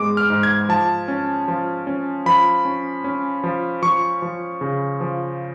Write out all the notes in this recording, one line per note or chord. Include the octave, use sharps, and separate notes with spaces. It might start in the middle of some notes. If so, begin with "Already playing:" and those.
Already playing: G#2 G#3 B3 D6
F6
G#2
G#6
F3 A5
C#4
F3
C#4
F3 B5
C#4
C#4
F3
F3 C#6
F3
C#3
F3